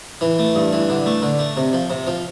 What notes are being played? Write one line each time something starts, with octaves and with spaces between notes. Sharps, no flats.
E3
A3
G2
E3
D3
A3
D3
A3
C3
F3
C3
F3